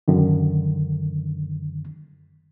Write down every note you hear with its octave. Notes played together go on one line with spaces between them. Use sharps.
F#2 D3 D#3